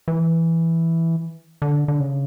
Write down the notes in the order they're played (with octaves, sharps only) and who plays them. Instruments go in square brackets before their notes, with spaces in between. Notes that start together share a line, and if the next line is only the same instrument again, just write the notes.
[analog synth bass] E3
D3
D3
C#3